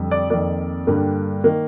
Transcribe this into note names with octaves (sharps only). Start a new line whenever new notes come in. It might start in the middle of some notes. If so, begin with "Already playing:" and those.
Already playing: F2 D3 G3
D5
F2 D#3 A#3 D5
G2 D3 G3 A#3
D#3 A#3